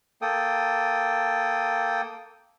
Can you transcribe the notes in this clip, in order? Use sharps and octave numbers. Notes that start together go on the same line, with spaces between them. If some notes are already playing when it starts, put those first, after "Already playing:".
A#3 A4 G5 D#6